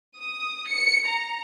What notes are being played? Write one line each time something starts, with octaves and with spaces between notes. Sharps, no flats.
D#6
C#7
A#5